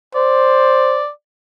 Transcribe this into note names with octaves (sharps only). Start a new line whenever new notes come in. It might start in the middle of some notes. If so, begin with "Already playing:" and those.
C5 D5